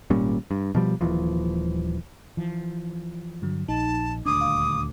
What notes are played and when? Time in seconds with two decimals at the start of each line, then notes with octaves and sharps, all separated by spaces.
0.10 G#1 A#2 G3 C#4
0.51 G2
0.75 B2 F3 G3
1.01 D#1 D#2 E3 F3
2.37 E3 F3
3.42 G2 D3 F#3
3.68 A#1 D#4 A5
4.26 D#1 D2 D4 D6 D#6
4.41 F5